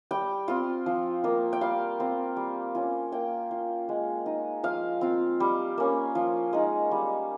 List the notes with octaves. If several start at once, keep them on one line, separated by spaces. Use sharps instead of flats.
G3 G5
C4 F4
F3
A#3 F4
G5
G3 F5
C4 F4
G3
C#4 F4
A#3 G5
F4
G#3
D#4
F3 F5
C4 F4
G3
A#3 C#4
F3
G#3 D#4
G3